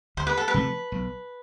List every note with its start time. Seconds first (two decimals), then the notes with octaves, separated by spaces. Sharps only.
0.17 D2 C5
0.27 B4
0.37 A4
0.48 B4
0.54 C3 F3 A3
0.92 B1